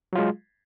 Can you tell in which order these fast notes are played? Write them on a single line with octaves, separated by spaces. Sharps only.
F#3 F4 G#3